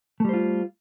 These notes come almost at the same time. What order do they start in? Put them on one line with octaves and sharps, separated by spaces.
A3 G3 C5 F4